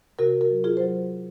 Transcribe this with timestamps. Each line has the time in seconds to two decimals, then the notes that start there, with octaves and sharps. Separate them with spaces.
0.19 C3 F#4 A#4
0.41 F#4 A#4
0.50 F#3
0.64 F4 G#4
0.77 F#3 C5